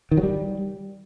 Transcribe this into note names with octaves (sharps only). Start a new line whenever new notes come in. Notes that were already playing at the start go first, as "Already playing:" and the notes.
D#3
F#3
G3